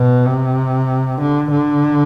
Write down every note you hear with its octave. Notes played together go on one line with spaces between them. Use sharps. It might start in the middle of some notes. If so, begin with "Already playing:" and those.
Already playing: B2
C3
D3
D3